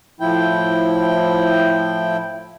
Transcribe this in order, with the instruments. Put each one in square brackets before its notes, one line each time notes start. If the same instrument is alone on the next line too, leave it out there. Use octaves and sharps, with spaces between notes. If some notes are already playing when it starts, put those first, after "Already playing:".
[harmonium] A2 F3 E4 G5